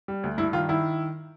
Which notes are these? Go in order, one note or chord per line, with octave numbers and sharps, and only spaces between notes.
G3
D2
G2 E4
D#3 F4
D#3 E4